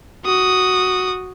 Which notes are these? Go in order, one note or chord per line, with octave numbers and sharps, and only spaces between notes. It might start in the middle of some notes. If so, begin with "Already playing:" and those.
F#4 D#6